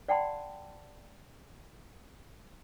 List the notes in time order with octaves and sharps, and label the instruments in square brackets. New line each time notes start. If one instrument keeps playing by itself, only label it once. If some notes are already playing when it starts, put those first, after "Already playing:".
[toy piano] D5 F#5 G5 A5 B5 C6